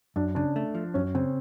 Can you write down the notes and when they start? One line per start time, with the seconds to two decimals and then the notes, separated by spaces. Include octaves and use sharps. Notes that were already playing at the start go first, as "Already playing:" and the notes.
0.16 F#2 D4
0.35 C#3 D4
0.56 A3
0.75 F3
0.94 F#2 C#4
1.15 C#3 C4